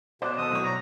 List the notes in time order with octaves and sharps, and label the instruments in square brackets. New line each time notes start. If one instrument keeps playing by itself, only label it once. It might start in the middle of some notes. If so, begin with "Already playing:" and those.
[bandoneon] B2 [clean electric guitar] B3 D5 [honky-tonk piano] C5
[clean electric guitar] D#2 A4 [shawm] D#6
[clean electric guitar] B1 [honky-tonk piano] A2 C#5
[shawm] A#5